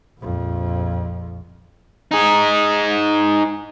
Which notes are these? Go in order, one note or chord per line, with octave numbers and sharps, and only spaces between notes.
A#1 F2
D#4 G#4